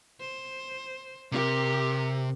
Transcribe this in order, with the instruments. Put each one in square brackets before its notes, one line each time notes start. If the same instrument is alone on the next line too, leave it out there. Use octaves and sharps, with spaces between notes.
[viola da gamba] C5
[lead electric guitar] C3 [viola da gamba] G4 A#4